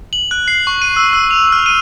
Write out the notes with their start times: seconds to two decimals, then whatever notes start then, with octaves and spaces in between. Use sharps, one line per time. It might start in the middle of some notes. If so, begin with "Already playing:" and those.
0.13 F#7
0.31 F#6
0.48 C7
0.67 C#6
0.82 D#7
0.96 E6
1.13 E6
1.31 F7
1.52 F6
1.66 D#7